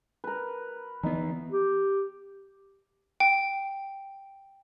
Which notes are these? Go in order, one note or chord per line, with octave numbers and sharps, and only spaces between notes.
A#4 B4
E3 B3 D#4
G4
G5